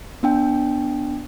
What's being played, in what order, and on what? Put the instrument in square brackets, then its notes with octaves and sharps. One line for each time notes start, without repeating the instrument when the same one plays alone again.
[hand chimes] B3 D4 G5